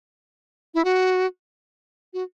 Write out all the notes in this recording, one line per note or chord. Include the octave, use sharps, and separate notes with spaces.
E4
F#4
F#4